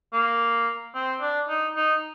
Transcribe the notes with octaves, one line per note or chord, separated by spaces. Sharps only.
A#3
C4
D4
D#4
D#4